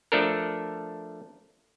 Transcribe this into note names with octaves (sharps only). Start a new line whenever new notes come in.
F3 A3 D4 A4 A#4